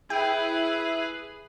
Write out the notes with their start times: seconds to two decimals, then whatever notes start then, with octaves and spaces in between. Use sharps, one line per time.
0.10 E4 G#4 B4 G5